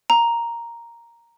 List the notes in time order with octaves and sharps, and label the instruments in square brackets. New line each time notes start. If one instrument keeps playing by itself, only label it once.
[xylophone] A#5